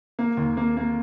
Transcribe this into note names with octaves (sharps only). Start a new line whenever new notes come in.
A#3
D#2
A#3
A#3